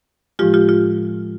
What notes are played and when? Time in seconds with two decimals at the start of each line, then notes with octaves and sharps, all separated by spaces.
0.39 A2 F3 G#3 F4 G4
0.54 F4 G4
0.69 F4